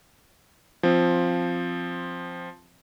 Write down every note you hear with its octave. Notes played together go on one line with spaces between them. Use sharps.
F3 C4